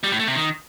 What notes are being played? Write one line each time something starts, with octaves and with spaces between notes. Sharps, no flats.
G3
A2
A3
C3
D#3